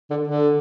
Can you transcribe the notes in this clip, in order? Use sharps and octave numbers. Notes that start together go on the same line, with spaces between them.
D3
D3